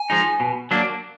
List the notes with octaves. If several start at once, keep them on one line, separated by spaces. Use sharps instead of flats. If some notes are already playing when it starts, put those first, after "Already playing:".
Already playing: G#5
F3 G#3 D#4
B2
F#3 A#3 D4